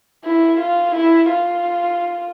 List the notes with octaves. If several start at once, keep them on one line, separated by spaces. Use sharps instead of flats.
E4
F4
E4
F4